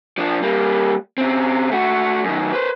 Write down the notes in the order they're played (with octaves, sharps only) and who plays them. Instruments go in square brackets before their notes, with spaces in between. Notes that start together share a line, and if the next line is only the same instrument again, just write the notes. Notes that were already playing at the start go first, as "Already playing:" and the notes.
[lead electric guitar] F3 D4
G3 A#3
C#3 C4
A3 F#4
F#2 D#3
B4 C5